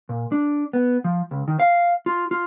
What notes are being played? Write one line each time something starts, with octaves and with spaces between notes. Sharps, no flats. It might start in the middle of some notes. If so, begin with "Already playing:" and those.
A#2
D4
B3
F3
C#2
D#3
F5
F4
F4